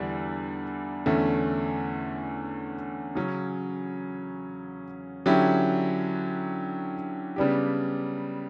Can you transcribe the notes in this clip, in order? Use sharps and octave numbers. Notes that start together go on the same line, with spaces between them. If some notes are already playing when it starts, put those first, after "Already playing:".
Already playing: E2 D3 G3
E2 D3 A3 C#4
C#3 F#3 C#4
D3 F#3 C#4 E4 G4
C#3 G3 B3 D4 G4